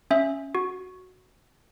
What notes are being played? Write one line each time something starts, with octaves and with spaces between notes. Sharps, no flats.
C#4 E5
F#4